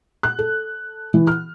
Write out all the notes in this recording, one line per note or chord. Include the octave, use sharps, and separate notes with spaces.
F#6
A4
E3
F6